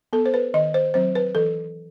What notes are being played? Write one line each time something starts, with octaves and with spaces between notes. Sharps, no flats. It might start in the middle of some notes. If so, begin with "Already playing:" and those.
B3 A4
C5
B4
D#3 D#5
C5
F#3 C4 C5
B4
E3 A4